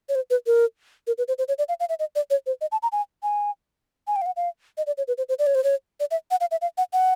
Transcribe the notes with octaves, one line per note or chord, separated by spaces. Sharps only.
C#5
C5
B4
A#4
A#4
B4
C5
C5
C#5
D5
F5
F5
E5
D#5
D5
C#5
C5
D#5
A5
A#5
G#5
G#5
G#5
G5
F5
F#5
F5
D#5
D5
C#5
B4
C5
C5
D5
C#5
C5
C#5
D5
E5
F#5
F5
E5
F5
F#5
F#5